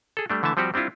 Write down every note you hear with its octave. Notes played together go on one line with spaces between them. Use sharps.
G#4 A4
G3 A3 D4
D3 E3 A3 E5 A5
F3 G3 C4 F#4 G4
G3 C4 D4 E4 F4